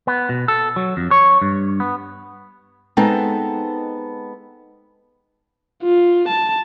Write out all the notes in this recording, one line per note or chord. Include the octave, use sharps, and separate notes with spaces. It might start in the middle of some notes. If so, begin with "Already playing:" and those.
B3
B2
A4
F#3
F2
C#5
G2
B3
G#3 B3 C4 D#4 A4
F4
A5